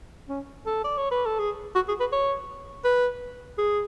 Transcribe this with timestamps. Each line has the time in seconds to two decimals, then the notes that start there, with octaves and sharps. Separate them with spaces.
0.29 C#4
0.66 A4
0.84 D5
0.98 C#5
1.11 B4
1.26 A4
1.39 G#4
1.75 F#4
1.88 G#4
2.00 B4
2.12 C#5
2.85 B4
3.58 G#4